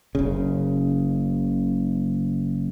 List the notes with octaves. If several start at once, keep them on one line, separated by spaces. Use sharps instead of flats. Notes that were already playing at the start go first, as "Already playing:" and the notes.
F#1 C#3